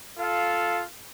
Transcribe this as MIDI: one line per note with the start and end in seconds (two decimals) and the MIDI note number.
0.19 0.83 65
0.19 0.83 69
0.19 0.83 77